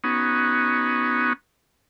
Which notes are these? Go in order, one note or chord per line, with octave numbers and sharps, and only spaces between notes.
B3 C#4 D#4 F#4